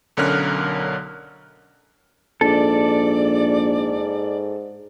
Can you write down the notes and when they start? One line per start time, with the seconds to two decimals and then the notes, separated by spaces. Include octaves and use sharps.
0.17 B1 D3 C#4 A#4 F6 F#6
2.41 A#1 G#2 A4 D5